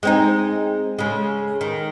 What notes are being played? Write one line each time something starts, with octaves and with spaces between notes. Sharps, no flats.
G#3 C4 D#4
C#3 G#3
D#3